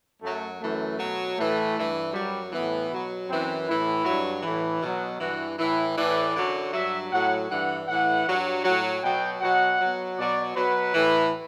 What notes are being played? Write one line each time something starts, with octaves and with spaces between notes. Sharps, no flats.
F#2 F#3 A3
F#2 E3 A3
B2 F#3
A2 E3 A3
G2 E3
F#2 F#3 G3
A2 E3 B3
B2 F#3
F#2 E3 C4
A2 E3 E4
G2 F#3
A2 E3
B2 F#3
G2 E3 F#4
A2 E3 E4
A2 E3 D5
F#2 D3 F#3
G2 F#3 E5
A2 F#3 F#5
G2 E3 F#5
A2 E3 F#5
G2 F#3
A2 F#3 F#5
B2 F#3 G5
B2 F#3 F#5
B2 F#3
B2 F#3 D5
B2 F#3 B4
A2 E3